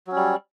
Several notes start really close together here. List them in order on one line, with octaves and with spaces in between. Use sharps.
F#3 C#4 G3